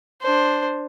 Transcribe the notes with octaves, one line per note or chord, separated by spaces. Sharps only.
D4 C5